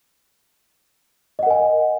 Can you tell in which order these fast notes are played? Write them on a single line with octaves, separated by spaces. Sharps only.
D#5 F#5 A#4 G#5